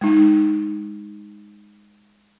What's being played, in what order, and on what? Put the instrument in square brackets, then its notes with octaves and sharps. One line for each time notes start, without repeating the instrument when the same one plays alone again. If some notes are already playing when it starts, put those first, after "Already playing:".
[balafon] G#3 D#4